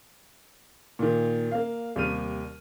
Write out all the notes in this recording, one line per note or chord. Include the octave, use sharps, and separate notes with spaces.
A#2 D#3
A#3 F5
D#2 C3 G3 F6 D#7